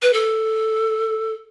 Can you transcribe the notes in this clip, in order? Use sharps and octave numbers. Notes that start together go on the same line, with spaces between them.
B4
A4